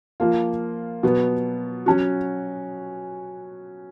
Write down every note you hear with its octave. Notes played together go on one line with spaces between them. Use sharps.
F3 A#3 F4
B2 F#3 B3
F#3 C#4 F#4